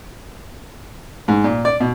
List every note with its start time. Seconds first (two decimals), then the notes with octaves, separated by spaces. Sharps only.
1.28 G#2
1.44 A#2
1.65 D5
1.80 B2